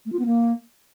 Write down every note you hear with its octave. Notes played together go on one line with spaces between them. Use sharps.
A3
F4
B3
A#3